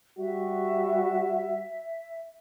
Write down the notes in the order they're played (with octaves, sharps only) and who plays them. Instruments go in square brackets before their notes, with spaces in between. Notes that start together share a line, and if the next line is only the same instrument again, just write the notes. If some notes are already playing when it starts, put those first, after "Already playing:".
[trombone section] G3 F#4 [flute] E5